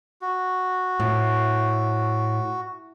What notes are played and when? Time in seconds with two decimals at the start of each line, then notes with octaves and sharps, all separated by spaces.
0.22 F#4
1.00 A2